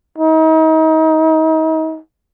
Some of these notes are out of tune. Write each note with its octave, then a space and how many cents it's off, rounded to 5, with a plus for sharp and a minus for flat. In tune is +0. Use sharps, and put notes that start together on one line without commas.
D#4 +35